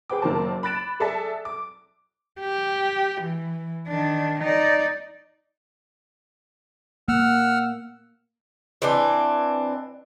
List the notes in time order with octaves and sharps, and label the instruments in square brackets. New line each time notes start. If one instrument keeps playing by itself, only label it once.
[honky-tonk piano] G#4 B4 C5 G5 D6
F#1 D#3 F#3 A#3 C5 A5
B5 F#6 A6 D7 E7
G#4 A4 D5 E5 A5
D6
[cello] G4
E3
D#3 D4
D#4 D5
[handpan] A#3 [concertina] F#5 E6 F6
[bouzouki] E3 C4 D4